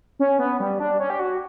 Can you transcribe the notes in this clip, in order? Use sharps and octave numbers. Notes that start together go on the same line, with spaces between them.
C#4
B3
G3
D4
C#4
G4
F#4